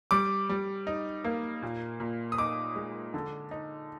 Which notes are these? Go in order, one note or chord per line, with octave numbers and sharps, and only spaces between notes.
G3 D6
G3
D#4
A#3
A#2
A#2
D#6
D#4 D6
G#3
D3
D#4